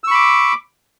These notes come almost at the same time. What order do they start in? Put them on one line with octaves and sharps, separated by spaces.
E6 C#6 B5 D6